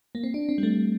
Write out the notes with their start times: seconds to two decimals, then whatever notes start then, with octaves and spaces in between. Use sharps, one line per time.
0.15 A#3
0.24 C4
0.34 D4
0.49 C4
0.58 G3
0.63 A3